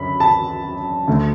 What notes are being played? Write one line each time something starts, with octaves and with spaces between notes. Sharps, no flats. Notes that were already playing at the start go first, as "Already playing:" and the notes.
Already playing: F#2 D3 C#4 B5
A5
D2 D3 A3